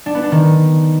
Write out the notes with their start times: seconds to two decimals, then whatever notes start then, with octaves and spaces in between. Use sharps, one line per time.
0.06 D4
0.15 B3
0.23 D4
0.32 D#3